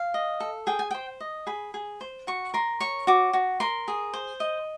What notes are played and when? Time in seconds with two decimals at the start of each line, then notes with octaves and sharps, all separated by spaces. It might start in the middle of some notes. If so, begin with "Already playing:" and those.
Already playing: F5
0.14 D#5
0.40 A4
0.67 G#4 G5
0.79 G#5
0.91 C5 G5
1.20 D#5
1.47 G#4 B5
1.74 G#4
2.01 C5
2.27 F#4 C#6
2.54 A#4 C6
2.80 C#5 C#6
3.07 F#4 D6
3.33 F#4
3.60 A#4 C6
3.88 G#4
4.14 C5
4.40 D#5